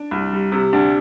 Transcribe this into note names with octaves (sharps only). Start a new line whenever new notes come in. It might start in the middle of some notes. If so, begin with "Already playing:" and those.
Already playing: D4
C2
G3
C3
D2 D4